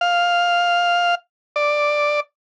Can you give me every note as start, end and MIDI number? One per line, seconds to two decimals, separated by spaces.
0.01 1.15 77
1.56 2.20 74